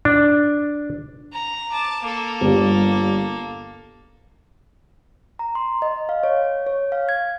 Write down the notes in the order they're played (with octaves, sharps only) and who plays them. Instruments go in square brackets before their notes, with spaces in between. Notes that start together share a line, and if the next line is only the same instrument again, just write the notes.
[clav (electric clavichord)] D4
[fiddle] A#5
A5 D6
A#3 A4
[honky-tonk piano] G1 G3
[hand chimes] A#5
C6
D#5
F5
C#5
C#5
F5
G#6